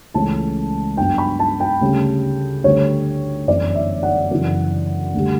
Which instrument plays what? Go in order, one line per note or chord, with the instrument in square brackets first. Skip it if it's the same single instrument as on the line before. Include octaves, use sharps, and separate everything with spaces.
[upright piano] C#2 C#3 E3 A3 C#4 A5
G2 F#3 B3 D4 G5
B5
A5
G5
D2 C#3 G3 C#4
D2 D3 G3 C#5
G1 F#2 E3 D5
E5
F#5
F#2 C#3 E3
D2 D3 G3